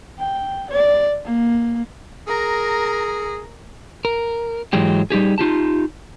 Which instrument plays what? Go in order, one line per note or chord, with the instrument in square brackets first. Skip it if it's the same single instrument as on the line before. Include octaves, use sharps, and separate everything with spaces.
[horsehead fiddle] G5
D5
A#3
[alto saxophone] G#4 [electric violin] A#4 A#5
[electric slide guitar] A#4
G#2 E3 F#3 G#3 G4
G3 D#4 G4 G#4
D#4 F4 G4 A5